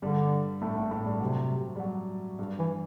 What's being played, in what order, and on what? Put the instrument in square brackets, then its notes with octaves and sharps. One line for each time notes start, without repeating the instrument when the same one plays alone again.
[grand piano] G2 G3 [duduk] D3
[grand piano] A2 A3
A2 A3
A2 A3
G2 G3
[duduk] C3 [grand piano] F#3
[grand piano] G3
F#3
G2 G3
[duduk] E3